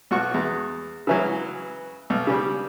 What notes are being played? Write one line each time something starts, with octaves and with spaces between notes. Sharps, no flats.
B1 F#4 C#6
E2
C#3 E3 F#3
B1
C#3 G3